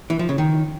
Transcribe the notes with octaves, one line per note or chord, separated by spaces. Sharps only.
E3
F3
C#3
D#3